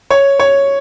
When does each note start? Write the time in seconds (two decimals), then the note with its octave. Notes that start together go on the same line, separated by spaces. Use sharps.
0.10 C#5
0.39 C#5